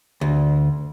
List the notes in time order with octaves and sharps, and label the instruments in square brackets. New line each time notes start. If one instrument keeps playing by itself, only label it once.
[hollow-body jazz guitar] D2